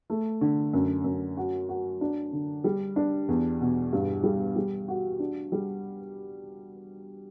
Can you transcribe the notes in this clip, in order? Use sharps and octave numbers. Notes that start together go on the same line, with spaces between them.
A3
D3
F#2
F#2
F#4
F#4
D4
D3
G3
D4
E2
B2
G2
G3
G3
F#4
D4
G3